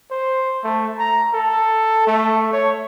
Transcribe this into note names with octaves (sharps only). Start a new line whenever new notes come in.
C5
A3
A#5
A4
A3
C#5